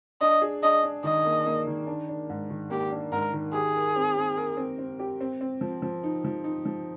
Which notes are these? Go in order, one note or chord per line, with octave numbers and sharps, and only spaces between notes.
D4 D#5
G#4
D4 D#5
D4
D#3 D#5
A#3
A#3
D#3
D4
D4
G#2
D#3
A#3 G4
D4
G#2 A#4
D#3
G4 G#4
A#4
C4
C4
A#4
C4
C4
G4
C4
C4
F3
F3
D#4
F3
D#4
F3